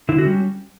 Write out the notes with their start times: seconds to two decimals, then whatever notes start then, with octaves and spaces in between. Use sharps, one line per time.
0.09 D3 E4
0.18 F#4
0.24 G3 C#4